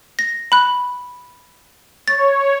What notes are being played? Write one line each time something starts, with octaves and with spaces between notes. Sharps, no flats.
A#6
B5 F#6
C#5 A6